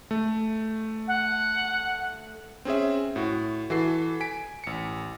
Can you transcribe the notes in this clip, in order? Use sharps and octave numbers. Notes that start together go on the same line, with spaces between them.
A3
F#5
C4 C#4 G#4 E5
A2 F#4
E3 F#4 A4 C7
G#5 B6 D7
A1 C#7